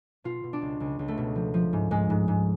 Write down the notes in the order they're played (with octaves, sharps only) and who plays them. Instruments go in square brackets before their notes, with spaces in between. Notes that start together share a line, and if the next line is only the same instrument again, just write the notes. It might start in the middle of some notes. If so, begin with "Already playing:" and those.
[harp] B2 F4
B2
D4
C#2
C#2
C#2
A3
B2
F3
F3
G#2
G#2 G#3
G#2
G#2